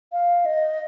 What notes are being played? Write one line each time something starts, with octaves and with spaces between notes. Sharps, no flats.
F5
D#5